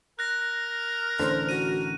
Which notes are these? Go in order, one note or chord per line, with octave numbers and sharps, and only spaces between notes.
A#4 F#6 A#6
A1 D3 C5
F#4 D#7